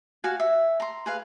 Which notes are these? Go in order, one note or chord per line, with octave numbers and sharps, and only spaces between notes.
F#4 F5 G#5
E5
A#5 C6
G#4 B4 F5